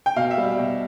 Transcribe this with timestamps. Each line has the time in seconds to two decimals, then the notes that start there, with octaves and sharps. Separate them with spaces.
0.06 G5
0.16 B2 F5
0.31 E5
0.38 G3
0.59 B2